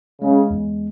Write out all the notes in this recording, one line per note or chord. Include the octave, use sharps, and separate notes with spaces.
C#3 G#3
E2